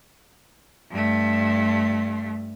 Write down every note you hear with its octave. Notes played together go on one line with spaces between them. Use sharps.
G2 A3